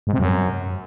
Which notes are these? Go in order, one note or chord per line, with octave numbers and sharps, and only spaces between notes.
G#2
C3
F#2